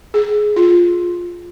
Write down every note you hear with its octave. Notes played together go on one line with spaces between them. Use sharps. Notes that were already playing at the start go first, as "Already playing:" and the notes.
G#4
F4